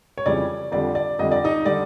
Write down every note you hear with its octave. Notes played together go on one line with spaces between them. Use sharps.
C#5
F2 C#3 E3 G3 D5
F2 D3 G3 D5
D5
F2 D3 G3 D#5
D5
D#4 D#5
D3 G3 D5